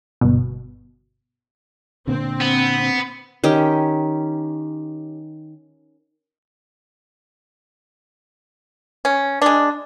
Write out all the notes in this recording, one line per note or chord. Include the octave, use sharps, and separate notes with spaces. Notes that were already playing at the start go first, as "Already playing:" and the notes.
G1 B2
A#2 D3 C4
B3
D#3 C#4 G4
C#4
G#3 D4